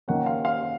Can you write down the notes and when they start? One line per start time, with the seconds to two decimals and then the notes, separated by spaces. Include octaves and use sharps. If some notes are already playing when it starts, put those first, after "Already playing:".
0.08 D#3 A#3 C#4 F#5
0.26 F5
0.45 F5